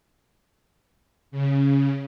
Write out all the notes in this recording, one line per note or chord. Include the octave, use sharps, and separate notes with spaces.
C#3